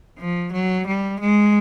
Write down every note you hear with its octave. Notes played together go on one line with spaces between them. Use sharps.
F3
F#3
G3
G#3